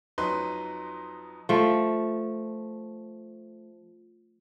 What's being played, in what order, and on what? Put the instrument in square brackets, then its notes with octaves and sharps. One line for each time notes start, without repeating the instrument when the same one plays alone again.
[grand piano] F2 F#3 D#4 B4 C6 F#6
[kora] F3 A3